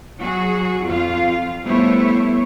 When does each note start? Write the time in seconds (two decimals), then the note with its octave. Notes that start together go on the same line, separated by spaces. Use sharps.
0.20 F#3 F#4 G#4
0.86 F2 F4 F5
1.64 G3 A3 B3 E4 C5 C#5